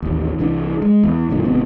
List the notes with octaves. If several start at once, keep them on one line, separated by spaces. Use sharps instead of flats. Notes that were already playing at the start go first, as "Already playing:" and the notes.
A1 D#2
C2 E3 D4
G#3
E2
G#1 F#2 A#2 D3
G#1 F2 C3 B3